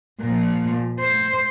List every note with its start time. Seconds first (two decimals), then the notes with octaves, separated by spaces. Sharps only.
0.21 A#2 F3
1.00 C5